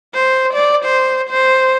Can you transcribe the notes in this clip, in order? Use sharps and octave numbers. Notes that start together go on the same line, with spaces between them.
C5
D5
C5
C5